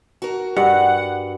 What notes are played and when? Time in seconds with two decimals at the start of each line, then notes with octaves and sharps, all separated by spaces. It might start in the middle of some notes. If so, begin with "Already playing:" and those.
0.22 F#4 A#4
0.57 G2 F#5